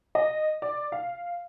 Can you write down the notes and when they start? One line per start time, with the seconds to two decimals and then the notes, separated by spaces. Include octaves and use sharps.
0.15 D#5
0.62 D5
0.92 F5